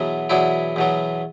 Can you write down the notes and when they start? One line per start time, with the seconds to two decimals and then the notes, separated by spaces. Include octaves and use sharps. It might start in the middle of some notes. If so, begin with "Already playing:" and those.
Already playing: E2 B2 F#3
0.29 E2 B2 F#3 D4 E4
0.76 E2 B2 F#3